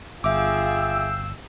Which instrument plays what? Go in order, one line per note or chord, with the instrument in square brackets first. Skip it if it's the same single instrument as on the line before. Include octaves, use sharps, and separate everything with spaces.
[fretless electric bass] G1 [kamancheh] F4 G#4 [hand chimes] E5 D6 [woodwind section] F5 G5 E6